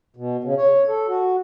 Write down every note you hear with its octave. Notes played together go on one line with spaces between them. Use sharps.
B2
C#3
C#5
A4
F#4